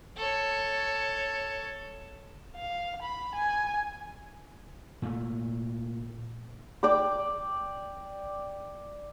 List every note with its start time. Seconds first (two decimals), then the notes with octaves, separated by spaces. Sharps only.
0.17 A4 C#5
2.56 F5
3.02 B5
3.35 G#5
5.02 A#2 A3
6.83 D5 G5 D6